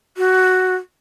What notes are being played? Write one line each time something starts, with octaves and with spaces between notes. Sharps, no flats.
F#4